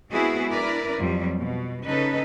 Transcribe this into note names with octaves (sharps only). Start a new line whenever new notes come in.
G#3 B3 C4 E4 F#4 G#4
D4 E4 A#4 B4 D5
F2 F#3 G3
B2
C#3 C#4 D#4 A4 B4